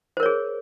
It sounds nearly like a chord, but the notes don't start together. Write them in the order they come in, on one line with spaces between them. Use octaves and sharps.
C5 A#4 C#5 G#4